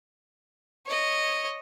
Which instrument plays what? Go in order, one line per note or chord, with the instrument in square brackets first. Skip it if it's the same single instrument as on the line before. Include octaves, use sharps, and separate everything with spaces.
[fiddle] C#5 D#5